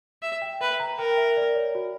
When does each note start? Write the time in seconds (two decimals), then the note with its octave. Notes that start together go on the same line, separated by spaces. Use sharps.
0.22 E5
0.42 G5
0.60 B4 E5
0.80 A#5
0.99 A#4 G5
1.17 E5
1.37 D5
1.55 C#5
1.75 F#4